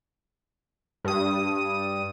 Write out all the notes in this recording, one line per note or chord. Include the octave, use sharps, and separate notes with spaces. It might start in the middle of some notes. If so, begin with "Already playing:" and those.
G2 D#6